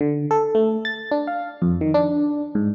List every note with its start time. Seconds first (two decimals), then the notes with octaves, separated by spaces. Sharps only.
0.01 D3
0.31 A4
0.55 A3
0.85 A6
1.11 D4
1.27 F5
1.62 F2
1.81 D#3
1.94 D4
2.55 G#2